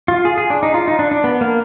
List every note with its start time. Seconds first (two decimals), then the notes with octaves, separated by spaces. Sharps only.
0.08 F4
0.25 G#4
0.38 G#4
0.50 D4
0.63 D#4
0.74 F4
0.88 D#4
0.99 D4
1.11 D4
1.24 B3
1.41 A#3